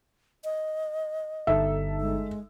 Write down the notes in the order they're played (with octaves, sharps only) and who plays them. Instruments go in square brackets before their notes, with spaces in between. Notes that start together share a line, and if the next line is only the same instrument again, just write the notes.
[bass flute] D#5
[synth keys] G1 D#4 A4 [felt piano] E5
[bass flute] G#3